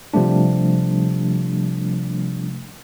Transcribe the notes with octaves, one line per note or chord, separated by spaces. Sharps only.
C3 F3 G3 A3 D4